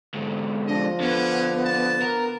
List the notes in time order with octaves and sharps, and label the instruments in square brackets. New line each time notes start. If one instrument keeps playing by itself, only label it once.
[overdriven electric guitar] G#2 D3
[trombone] F3 [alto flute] D4 [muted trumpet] D#5
[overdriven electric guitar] D3 [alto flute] B3 [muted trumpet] C#4
[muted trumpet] A5
[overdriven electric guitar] A#4